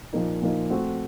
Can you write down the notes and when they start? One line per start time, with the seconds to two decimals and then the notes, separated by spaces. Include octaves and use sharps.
0.13 A#2 F3 A#3 D#4
0.42 A#2 F3 A#3 D#4
0.70 A3 C4 F#4